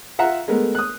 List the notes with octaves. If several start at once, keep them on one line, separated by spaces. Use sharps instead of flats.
F4 E5 F#5 A#5
G#3 A3 B3 A#4
D#6 F#6